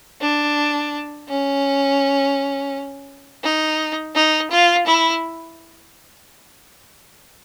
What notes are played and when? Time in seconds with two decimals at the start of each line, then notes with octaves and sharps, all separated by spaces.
0.21 D4
1.28 C#4
3.43 D#4
4.15 D#4
4.51 F4
4.86 E4